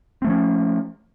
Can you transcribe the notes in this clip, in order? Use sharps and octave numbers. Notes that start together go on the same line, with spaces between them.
F3 A3 C4 C#4